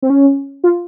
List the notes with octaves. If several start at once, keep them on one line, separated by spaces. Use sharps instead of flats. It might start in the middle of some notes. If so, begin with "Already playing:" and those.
C4
C#4
F4